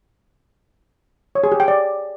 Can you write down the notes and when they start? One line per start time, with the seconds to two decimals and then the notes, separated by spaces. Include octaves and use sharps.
1.35 C#5
1.44 G#4
1.52 G4
1.60 G5
1.68 D5